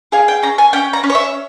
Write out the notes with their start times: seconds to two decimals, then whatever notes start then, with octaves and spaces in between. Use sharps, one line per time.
0.12 G#4 F5
0.28 G5
0.43 C#4 A#5
0.58 G#5
0.73 C#4 G5
0.93 A#5
1.04 C#4
1.10 C#5
1.15 E5